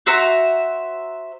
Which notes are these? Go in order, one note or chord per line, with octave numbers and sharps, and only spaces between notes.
F#4 C5 E5 A#5